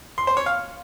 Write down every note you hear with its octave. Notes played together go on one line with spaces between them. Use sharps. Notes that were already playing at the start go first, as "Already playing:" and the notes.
C6
C5
C#5
F5